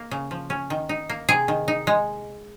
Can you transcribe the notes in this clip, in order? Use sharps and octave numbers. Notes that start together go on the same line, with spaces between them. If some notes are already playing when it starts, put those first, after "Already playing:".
Already playing: A#3
C#3
F3
C#4
D#3
D#4
A#3
C3 G#4
D#3
D#4
G#3